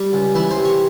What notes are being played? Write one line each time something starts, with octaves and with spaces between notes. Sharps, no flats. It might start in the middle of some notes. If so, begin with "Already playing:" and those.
Already playing: G3
C#2
E3 E4
C5
C3
C#5